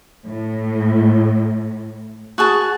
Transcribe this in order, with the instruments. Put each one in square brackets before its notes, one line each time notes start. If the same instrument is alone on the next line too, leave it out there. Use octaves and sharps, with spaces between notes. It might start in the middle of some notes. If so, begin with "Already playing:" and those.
[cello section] A2
[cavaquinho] F#4 G#4 A5